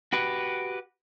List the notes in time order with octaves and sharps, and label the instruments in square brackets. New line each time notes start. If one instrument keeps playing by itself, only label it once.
[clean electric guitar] F#4 G4 B4